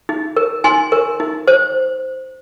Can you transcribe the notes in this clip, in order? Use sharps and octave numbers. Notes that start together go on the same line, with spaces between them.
D#4
A#4
D#4 G#5 C6
A#4
D#4
C5